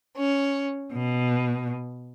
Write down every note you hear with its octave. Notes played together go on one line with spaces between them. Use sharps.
C#4
B2